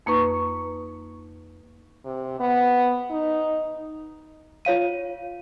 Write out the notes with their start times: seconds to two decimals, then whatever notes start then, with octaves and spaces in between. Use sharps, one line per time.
0.06 F2 A#3 D#4 B4 C#6
2.05 C3
2.40 B3
3.10 D#4
4.65 F4 C#5 F5 D#7